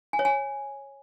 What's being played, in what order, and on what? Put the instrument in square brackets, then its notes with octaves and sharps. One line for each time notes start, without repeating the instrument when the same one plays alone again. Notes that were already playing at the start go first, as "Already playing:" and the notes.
[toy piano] G#5
C#5
G#5